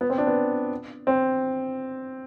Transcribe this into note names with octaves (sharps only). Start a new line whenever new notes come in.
B3
C4
D4
B3
C4